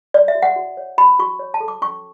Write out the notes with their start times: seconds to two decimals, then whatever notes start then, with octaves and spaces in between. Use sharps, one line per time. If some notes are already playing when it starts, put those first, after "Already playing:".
0.14 C#5 D5
0.28 E5
0.35 F#4
0.42 F#5
0.56 F#4
0.77 C#5
0.98 F#4 B5
1.19 F#4 C#6
1.39 C#5
1.54 A5
1.60 A4
1.68 D6
1.82 C#4 C#6